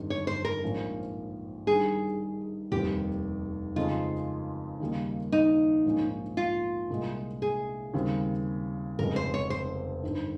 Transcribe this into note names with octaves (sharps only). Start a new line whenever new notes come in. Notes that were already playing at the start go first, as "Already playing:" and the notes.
Already playing: G1 F2 D#3 G3
C#5
C5
A#4
A#1 G#2 F3 A#3 C#4
G2 D#3 G3 G#4
F1 D#2 D#3 G3 C4 G4
F2 C#3 G#3 C4 D#4 F4
D#2 C#3 G3 A#3 D#4
D#4
A#1 G#2 F3 A#3 C#4
F4
C2 A#2 G#3
G#4
D#2 C#3 G3 C4
F1 F2 C#3 G#3 A#4
C5
C#5
C5
G1 G2 D#3